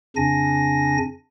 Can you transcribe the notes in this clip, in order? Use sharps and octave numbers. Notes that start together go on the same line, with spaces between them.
F2 C#3 D4 G#5 A#6